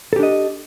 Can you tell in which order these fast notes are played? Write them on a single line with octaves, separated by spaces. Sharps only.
A4 G4 D4 D#5